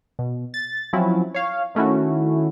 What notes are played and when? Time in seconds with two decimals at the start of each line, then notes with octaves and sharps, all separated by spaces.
0.19 B2
0.54 A6
0.93 F3 F#3 C4 C#4 E4 F#4
1.35 C#5 F5
1.75 D#3 A3 C#4 E4 F#4